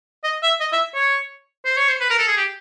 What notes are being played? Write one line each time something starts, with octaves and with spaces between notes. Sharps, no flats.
D#5
E5
D#5
E5
C#5
C5
C#5
C5
B4
A#4
A4
G#4
G4